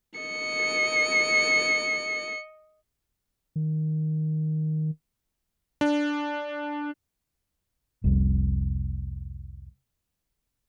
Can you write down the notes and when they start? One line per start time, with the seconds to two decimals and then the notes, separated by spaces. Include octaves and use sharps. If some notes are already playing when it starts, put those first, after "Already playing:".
0.20 D#5 C#7
3.56 D#3
5.81 D4
8.04 F1 C2